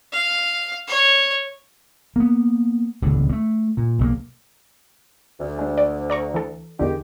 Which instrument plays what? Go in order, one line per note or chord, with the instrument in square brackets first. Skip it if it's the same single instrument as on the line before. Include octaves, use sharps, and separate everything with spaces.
[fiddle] F5
C#5
[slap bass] A#3 B3
D#1 C#2 A2 D3
A3 A#3
A#2
B1 G3 A#3
[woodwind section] D2
[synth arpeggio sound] G#3 D4
D5
D5 A#5 C#6
E3 A4
[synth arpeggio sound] E2 D3 [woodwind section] D#3 G#3 G4